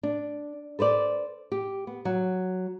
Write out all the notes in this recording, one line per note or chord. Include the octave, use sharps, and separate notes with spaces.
D4
A4 B4 C5 D5
G4
B3
F#3